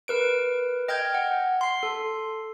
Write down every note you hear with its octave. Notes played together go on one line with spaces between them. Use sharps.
A#4 B4 D7
D#5 G5 F6 G6 G#6
F#5
C6 C7
A4